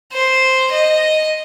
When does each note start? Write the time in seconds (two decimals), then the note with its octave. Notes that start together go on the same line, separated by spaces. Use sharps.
0.13 C5
0.73 D#5